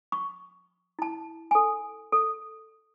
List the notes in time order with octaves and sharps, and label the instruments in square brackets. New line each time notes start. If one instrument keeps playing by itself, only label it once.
[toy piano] C#6
E4 A5
A4 G#5
A4